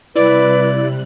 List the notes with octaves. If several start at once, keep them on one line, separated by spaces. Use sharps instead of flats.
C3 G3 E4 B4 D5 F#6